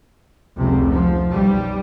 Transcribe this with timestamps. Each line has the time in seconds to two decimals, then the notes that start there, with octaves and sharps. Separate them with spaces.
0.58 F1 C#2 C3
0.90 F3
1.29 B1 G3